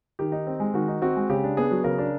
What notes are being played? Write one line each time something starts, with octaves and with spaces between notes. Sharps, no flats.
D#3 G4
D#4
C4
G#3
D#3 F#4
D#4
C4 F#4
G#3
C#3 G4
D4
B3 G#4
F#3
C#3 A#4
D4